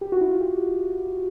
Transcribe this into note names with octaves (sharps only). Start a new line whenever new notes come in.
G4
F#4
E4
F4
G4